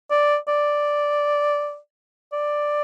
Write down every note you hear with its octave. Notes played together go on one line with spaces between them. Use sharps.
D5
D5
D5